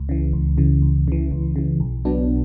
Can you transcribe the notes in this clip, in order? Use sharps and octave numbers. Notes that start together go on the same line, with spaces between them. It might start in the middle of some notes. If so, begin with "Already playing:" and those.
Already playing: C#2
C#3 E3
C#2
C#3 E3
C#2
C#3 E3
C#2
C#3 E3
B1
B2 F#3 B3 D4